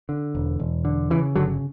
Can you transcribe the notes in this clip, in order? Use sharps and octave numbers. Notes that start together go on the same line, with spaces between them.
D3
E1
E1
D3
C#3 E3
G1 D3 F#3